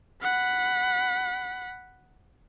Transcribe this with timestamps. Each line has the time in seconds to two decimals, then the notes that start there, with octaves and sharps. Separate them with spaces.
0.22 F#5 B5